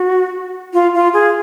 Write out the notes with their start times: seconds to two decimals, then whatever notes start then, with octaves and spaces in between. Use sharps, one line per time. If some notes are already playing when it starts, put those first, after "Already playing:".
Already playing: F#4
0.74 F4
0.95 F4
1.14 G#4